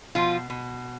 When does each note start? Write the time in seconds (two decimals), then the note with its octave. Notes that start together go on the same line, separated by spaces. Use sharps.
0.15 B2 F3 F4
0.50 B2